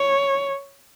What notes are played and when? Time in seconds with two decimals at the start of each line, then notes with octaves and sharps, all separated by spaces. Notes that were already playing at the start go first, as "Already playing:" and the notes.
Already playing: C#5